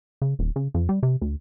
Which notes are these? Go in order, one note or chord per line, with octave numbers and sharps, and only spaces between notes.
C#3
D#1
C#3
F2
G3
C3
D2